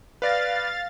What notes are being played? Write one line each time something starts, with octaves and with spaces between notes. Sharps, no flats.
B4 D5 F5 A6 A#6